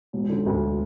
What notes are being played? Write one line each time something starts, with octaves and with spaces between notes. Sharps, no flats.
E1
D3
D2